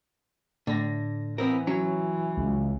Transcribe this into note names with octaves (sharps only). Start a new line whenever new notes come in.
A2 D3 A#6
E3 B3 C4 A#4
F#3 C#4
C#2